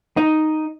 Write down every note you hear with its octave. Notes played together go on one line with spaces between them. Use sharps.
D#4